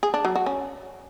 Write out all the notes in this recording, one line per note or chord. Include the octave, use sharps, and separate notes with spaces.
G#4
D4
F#3
F#4
C#4